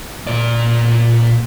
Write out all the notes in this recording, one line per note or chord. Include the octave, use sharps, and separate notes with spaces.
A#2 D5